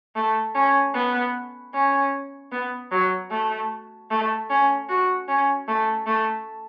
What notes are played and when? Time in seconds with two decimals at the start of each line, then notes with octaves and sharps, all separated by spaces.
0.15 A3
0.55 C#4
0.94 B3
1.73 C#4
2.52 B3
2.92 F#3
3.31 A3
4.10 A3
4.50 C#4
4.89 F#4
5.28 C#4
5.68 A3
6.07 A3